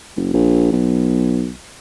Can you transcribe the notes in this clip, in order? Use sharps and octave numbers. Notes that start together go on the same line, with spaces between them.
F#1
A#1
B1